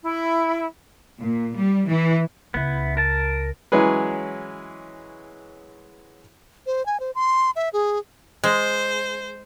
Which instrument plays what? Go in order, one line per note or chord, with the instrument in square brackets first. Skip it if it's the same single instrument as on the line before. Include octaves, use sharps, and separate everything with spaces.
[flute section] E4
[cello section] A#2
G3
E3
[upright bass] C#2 [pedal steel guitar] B3 E4
[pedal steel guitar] A#4 A5
[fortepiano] E3 F#3 G#3 C#4 G#4 B4
[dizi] C5
G#5
C5
C6
E5
G#4
[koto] G#3 [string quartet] C5